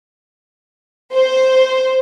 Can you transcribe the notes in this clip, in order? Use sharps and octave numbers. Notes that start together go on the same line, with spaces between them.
C5